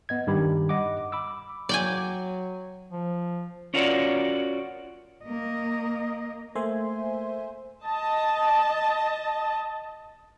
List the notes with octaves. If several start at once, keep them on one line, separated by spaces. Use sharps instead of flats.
B3 D#5 G#6
G2 D#3 G3 G4 B5
D#5 F#5 D6
B5 D6 E6
F#3 D5 G5 G#5
F3
C#4 F4 F#4 A#4 C#5 D5
A#3 D#5
A3 A#3 C5 E5 G#5 C6
D#5 A5